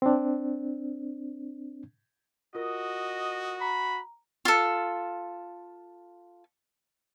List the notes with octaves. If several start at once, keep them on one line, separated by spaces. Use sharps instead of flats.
C4 D4
F4 F#4 A#4 D#5 D#6
A#5 B5
F4 A4